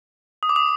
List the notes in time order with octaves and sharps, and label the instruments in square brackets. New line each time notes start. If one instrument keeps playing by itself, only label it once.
[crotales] D#6
D6
D#6